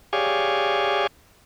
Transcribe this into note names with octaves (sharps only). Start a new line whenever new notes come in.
G4 G#4 C#5 D5 F5 G#5